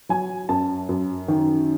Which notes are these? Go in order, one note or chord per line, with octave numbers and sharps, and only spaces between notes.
F#3 G#5
F#2 A5
F#2
D#3